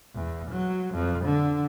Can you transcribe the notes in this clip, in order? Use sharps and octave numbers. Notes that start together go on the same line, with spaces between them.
E2
F#3
F2
D3